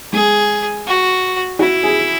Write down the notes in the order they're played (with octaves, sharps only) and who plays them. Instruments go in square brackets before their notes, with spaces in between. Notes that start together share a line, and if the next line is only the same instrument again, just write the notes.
[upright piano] G#3 [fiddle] G#4
[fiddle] F#4
[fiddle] E4 [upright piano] F#4
[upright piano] G#4